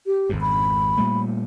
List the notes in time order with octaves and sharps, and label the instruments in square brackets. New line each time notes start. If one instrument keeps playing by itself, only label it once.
[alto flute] G4
[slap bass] G#1 F2 G#2
[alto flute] B5
[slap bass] A#2 G3 A3